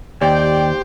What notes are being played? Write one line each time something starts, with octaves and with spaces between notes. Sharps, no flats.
D#2 G4 C5 D5 G5